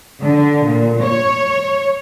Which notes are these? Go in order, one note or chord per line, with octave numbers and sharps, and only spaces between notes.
D3
A#2
C#5